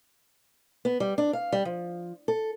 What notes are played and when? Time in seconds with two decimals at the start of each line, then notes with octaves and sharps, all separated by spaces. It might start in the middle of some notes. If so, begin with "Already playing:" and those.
0.85 B3
1.00 G3
1.18 D4
1.33 F5
1.53 G3
1.65 F3
2.28 A4